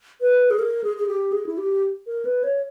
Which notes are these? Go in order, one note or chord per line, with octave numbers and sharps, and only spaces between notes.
B4
G#4
A#4
G#4
G#4
G4
G#4
E4
G4
A#4
B4
C#5